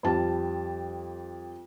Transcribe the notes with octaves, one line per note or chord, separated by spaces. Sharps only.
F2 G3 A5